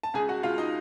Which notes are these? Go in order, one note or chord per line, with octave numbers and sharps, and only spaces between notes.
A5
C#2 G#4 G#5
F#4 F#5
C#2 F4 F5
D#4 D#5